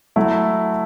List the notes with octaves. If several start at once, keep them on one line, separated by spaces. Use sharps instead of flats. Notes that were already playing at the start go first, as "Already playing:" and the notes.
F#3 A3 E4